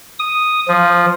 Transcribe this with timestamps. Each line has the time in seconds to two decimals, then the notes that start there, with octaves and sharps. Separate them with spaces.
0.19 D#6
0.68 F3